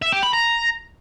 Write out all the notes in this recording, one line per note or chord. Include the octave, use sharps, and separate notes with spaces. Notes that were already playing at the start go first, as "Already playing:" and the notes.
E5
G4
B5
A#5